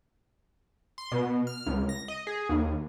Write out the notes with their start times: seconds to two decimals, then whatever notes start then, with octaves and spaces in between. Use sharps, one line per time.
0.98 C6
1.12 B2
1.47 F6
1.66 C#2
1.89 A#6
2.08 D#5
2.27 G#4
2.49 D#2